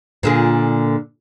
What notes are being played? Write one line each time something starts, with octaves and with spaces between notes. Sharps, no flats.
A#2 D3 G#4